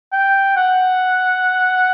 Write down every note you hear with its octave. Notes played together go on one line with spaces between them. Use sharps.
G5
F#5